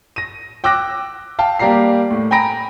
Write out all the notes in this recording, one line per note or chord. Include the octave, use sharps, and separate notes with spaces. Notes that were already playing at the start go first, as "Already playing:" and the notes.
A#6 D#7
G5 D6 E6 F#6 A#6
F5 G5 A5
G3 A#3 G4 D5 A#5 C7
A2
G5 G#5 A#5 B5 A#6 D7